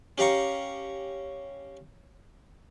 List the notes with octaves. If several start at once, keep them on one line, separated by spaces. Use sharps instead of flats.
C#4 G4 F5 A#5 C#6